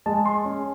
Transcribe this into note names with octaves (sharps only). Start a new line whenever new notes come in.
G#3 A5
C6
C#4